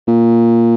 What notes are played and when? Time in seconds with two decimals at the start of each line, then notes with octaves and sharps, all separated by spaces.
0.08 A#2